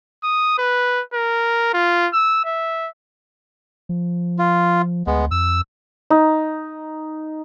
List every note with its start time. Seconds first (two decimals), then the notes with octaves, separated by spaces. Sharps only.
0.23 D#6
0.58 B4
1.14 A#4
1.74 F4
2.14 E6
2.45 E5
3.89 F3
4.39 F4
5.07 D2 G#3 B3
5.31 F2 E6
6.10 D#4